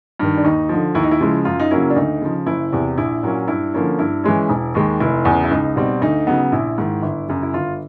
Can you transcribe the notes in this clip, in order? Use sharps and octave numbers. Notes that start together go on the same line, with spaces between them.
G2 D#3
D4
D#2 D#4
D3 F3
D#2 E4
D#4
E4
C#3 F3 G#3
F#2 F4
D#4
C#3 F#3 A#3 C#4 E4
D4
D2 D#4
C#3 F3
F#1 E4
E2 C3
A#1 E4
A#2 F#3 A#3 C#4
G2 E4
D3 F3 A#3 C#4
G2 E4
E3 G#3 C#4
E1
D#2 D#3 G#3
F1 E4
E2
C#3
E4
C#2 D#4
B2 G3 C4
D2 D#4
C#3 F#3 B3
A#1 E4
G#2 D#3
G1
F#2 C#3
E4
G1 F4